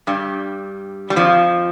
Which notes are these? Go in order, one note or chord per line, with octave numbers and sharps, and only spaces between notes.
G2 G3
G3
F2 F3